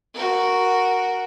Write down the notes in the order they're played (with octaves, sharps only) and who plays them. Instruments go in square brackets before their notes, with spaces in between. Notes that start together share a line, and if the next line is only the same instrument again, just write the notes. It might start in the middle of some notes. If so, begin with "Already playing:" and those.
[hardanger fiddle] F#4 A#4